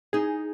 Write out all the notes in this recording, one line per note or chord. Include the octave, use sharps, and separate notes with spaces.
D#4 G#4